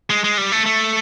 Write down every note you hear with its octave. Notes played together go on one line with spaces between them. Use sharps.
G#3
G#3
G3
A3
A3